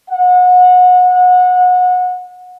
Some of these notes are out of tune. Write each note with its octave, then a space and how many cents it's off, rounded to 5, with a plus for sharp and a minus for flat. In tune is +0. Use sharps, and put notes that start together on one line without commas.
F#5 -30